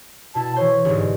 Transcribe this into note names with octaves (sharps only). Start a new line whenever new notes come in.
B2 E4 A5
E3 C5 C#5
G1 G#2